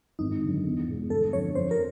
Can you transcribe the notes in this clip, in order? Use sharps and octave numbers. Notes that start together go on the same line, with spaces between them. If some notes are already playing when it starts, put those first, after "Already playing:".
G#1 D#4
F#2 D3
E2
B2 G#3
G1 A4
F2 D3 C#5
F2 C5
A#4